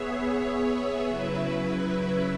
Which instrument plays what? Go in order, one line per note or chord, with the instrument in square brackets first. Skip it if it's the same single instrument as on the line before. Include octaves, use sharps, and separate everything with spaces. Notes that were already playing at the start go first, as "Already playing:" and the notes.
Already playing: [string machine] B3 G#4 C#5 E5
C#3 F#3 E4 B4 E5